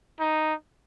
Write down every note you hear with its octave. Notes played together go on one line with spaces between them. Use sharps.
D#4